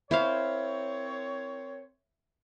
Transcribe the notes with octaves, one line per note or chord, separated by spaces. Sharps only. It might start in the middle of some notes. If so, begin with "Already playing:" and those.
C4 E4 A#4 C5 C#5 F5